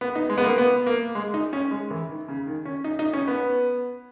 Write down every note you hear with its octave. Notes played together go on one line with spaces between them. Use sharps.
B3
D#4
G#3
B3
A#3
B3
A#3
G#3
D#4
C#4
G#3
E3
D#3
C#3
D#3
C#4
D#4
D#4
C#4
B3